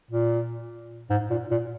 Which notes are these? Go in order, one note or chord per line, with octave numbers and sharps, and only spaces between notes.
A#2
G#2
A#2
A#2